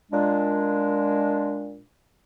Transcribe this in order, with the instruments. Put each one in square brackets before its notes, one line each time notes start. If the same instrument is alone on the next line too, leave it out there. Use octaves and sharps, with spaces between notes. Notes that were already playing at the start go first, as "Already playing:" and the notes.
[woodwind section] A#2 G#3 D4